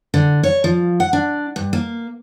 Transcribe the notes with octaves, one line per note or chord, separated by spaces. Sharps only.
D3
C#5
F3
F#5
D4
G2
A#3